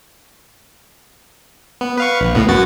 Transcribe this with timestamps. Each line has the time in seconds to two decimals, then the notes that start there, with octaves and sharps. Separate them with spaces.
1.81 B3
1.98 B4 F5 C#6
2.21 A#1
2.35 C#2 A2 B3
2.48 F#2 F#4 A6